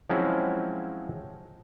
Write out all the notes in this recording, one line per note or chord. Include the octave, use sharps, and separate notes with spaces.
F3 F#3 G#3 C4 C#4 E4